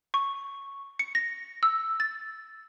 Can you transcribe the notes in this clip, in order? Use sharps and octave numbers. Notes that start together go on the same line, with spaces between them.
C#6
C#7
A#6
E6
A6